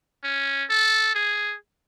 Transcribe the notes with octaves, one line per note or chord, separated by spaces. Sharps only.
C#4
A4
G#4